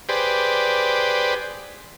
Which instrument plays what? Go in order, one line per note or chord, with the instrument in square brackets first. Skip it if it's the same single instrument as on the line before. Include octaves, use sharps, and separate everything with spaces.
[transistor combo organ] G4 G#4 B4 C5 D5